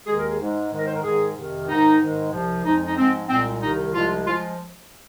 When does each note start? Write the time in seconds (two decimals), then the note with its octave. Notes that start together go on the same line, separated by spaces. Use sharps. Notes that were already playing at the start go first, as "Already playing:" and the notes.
0.06 D#2 D#3 G#3 G#4
0.17 A#4
0.28 G#4
0.39 G#2 G#3
0.71 G#2 D#3 G#3
0.79 A#4
0.87 C5
0.95 A#4
1.03 G#2 D#3 G#3 G#4
1.35 F2 C3 D#3
1.68 G#2 D#3 G#3 D#4
2.00 G#2 D#3 G#3
2.32 C2 C3 F3
2.65 F2 F3 G#3 D#4
2.87 D#4
2.97 G#2 F3 G#3 C4
3.29 C2 A#2 G#3 C4
3.61 C2 C3 D#3 D#4
3.94 C2 C3 F3 G#3 F4
4.26 F3 G#3 F4